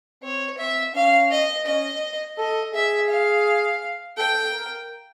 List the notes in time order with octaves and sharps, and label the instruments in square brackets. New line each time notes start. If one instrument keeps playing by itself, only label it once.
[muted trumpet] C4 [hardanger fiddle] C#5
[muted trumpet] C4 [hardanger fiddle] E5
[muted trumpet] C#4 [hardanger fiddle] F5
[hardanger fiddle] D#5
[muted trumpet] C#4 [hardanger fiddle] D#5
[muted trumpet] A4 [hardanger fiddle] D#5
[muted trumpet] G#4 [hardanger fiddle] E5
[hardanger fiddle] F5
[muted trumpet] A4 [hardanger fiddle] G5
[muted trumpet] A#4